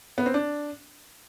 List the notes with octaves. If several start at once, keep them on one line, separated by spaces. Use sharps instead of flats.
B3
C4
D4